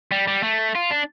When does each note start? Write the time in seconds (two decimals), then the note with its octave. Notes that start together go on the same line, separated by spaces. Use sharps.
0.12 G3
0.28 G3
0.43 A3
0.75 F4
0.91 D4